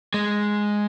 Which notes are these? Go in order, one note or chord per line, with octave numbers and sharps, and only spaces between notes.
G#3